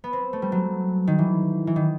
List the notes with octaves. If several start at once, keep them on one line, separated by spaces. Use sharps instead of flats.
B3
C4
A3
G3
F#3
D#3
E3
E3
D#3